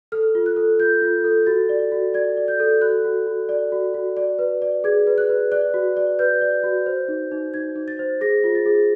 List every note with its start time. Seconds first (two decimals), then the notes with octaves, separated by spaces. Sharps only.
0.12 A4 F6
0.35 F4
0.46 F#6
0.57 A4
0.80 F4 G6
1.02 F4
1.24 A4
1.46 F#4 A6
1.69 D5
1.92 F#4
2.14 D5 G#6
2.37 D5
2.48 G6
2.60 A4
2.81 F#4 F#6
3.04 F#4
3.27 F#4
3.49 D5
3.72 F#4
3.94 F#4
4.17 D5
4.39 B4
4.62 D5
4.84 G#4 G#6
5.07 B4
5.18 F#6
5.29 B4
5.52 D5 F#6
5.74 F#4
5.97 D5
6.19 B4 G6
6.42 D5
6.64 F#4
6.86 C5
7.08 D#4
7.31 D#4
7.54 D#4 G#6
7.76 D#4
7.88 A6
7.99 C5
8.21 G#4 A#6
8.44 F4
8.55 A6
8.66 G#4